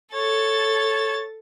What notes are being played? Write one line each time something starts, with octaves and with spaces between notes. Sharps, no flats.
A4 C#5 A6